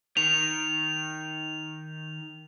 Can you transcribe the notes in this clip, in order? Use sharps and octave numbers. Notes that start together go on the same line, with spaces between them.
D#3 F7